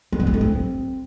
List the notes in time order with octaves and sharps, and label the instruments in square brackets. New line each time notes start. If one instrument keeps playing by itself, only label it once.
[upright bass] A#3
B3
A3
G3
C4